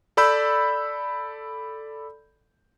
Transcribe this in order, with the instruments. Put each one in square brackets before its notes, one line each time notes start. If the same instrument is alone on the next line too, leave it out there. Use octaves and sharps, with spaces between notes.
[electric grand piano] A4 D5 B5 E6 G6